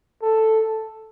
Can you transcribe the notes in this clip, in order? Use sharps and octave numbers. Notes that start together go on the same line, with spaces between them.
A4